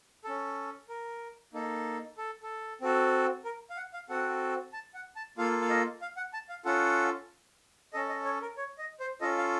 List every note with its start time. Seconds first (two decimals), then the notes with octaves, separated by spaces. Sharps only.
0.25 C#4 A4
0.89 A#4
1.53 A#3 D#4 A4
2.18 A4
2.43 A4
2.81 C4 F#4 A4
3.45 A#4
3.70 F5
3.77 F#5
3.93 F5
4.09 C4 F#4 A4 F#5
4.73 A5
4.94 F#5
5.16 A5
5.38 A#3 F4 A4 F5
5.61 F5
5.70 D#5
6.02 F5
6.17 F#5
6.34 A5
6.49 F5
6.65 C#4 F4 A4 F#5
7.93 C#4 A4 D#5
8.09 D#5
8.25 C#5
8.42 A#4
8.57 C#5
8.78 D#5
9.00 C5
9.21 C#4 F4 A4 D#5
9.38 F5